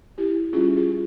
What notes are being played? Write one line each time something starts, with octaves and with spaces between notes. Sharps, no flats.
E4 G4
G3 C#4 F4 G#4
F4 G#4